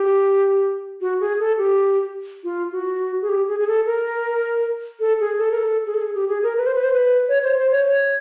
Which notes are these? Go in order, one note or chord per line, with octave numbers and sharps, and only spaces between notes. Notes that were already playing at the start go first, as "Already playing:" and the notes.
Already playing: G4
F#4
G#4
A4
G4
F4
F#4
G#4
G4
G#4
G#4
A4
A#4
A4
G#4
A4
A#4
A4
G#4
A4
G#4
G4
G#4
A#4
B4
C5
B4
C5
B4
C#5
C5
C5
C#5